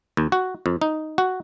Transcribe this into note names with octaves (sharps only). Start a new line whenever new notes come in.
D#2
F#4
F2
D#4
F#4